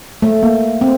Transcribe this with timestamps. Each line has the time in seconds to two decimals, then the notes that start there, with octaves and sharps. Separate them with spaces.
0.22 A3
0.43 A#3
0.81 C4